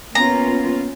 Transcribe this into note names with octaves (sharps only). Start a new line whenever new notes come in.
A#3 B3 C#4 F4 A#5